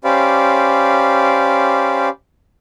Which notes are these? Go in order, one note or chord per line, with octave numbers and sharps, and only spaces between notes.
C#4 G4 C5 D5 F5 B5